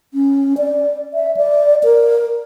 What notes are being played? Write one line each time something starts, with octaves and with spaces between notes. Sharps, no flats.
C#4
D5
E5
D5
A#4